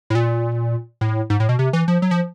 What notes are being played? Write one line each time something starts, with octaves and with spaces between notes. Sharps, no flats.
A2
A#2
A2
G#2
A2
B2
C3
E3
F3
F#3
F3